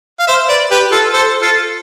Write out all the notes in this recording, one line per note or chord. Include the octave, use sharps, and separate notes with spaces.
F5
C5 E5
B4 D5
G4 B4
F4 A4
A4 C5
F4 A4